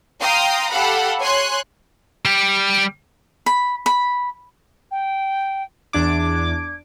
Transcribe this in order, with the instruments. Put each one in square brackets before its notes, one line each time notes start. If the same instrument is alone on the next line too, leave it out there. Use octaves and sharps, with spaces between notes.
[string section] F5 G5 A#5 C6 D#6
G4 A4 F5 F#5 B5
C#5 G#5 C6 F#6
[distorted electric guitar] G3 G4
[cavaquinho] B5
B5
[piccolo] G5
[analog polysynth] E2 D4 D6 [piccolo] G#6